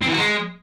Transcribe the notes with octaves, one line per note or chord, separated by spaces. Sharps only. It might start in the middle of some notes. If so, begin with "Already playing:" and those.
C4
E3
F#4
G#3